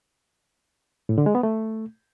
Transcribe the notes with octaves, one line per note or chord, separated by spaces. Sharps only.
A2
D3
G#3
B3
A3